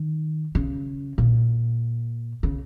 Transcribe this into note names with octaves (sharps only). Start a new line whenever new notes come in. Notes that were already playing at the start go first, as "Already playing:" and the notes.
Already playing: D#3
C#3
A#2
C#3